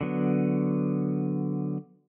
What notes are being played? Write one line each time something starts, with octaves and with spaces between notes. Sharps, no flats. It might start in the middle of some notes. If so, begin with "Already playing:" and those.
D3 F#3 B3